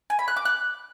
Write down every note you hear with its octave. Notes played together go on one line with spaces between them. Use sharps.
G#5
B5
F#6
D6
F#6